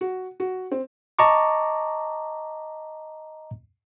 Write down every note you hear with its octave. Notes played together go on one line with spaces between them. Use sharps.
F#4
F#4
C4
D#5 A5 A#5 C#6 D6